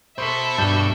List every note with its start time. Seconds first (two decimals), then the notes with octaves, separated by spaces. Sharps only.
0.18 B2 A4 C5 E5 B5
0.58 G2 A5 G6